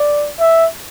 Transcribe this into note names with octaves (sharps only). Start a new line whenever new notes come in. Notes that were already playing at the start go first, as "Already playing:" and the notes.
Already playing: D5
E5